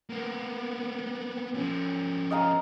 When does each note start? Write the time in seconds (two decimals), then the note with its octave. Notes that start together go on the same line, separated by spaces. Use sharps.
0.10 A#3 B3
1.54 F3 C#4
2.31 D#5 F5 A#5